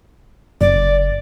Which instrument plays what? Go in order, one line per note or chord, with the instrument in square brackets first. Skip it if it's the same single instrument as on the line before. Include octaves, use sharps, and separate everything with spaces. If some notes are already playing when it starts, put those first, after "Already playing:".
[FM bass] F#1 [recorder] D5